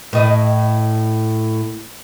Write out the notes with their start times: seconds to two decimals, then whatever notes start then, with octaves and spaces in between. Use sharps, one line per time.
0.13 A2 D#5